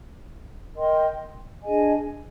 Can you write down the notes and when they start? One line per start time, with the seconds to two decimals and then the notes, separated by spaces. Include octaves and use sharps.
0.76 A#4 D#5 G5 C6
1.63 D4 G#4 D#5 G#5